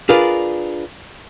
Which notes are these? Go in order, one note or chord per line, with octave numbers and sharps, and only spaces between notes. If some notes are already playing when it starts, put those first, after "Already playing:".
D4 F4 G#4 A#4 B4